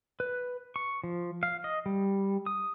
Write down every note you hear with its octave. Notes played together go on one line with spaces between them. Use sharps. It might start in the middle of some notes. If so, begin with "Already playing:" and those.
B4
C#6
F3
F5
D#5
G3
D#6